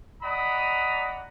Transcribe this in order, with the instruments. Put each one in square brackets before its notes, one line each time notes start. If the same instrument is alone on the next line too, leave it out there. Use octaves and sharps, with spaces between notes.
[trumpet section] D5 D#5 F#5 A#5 B5 D#6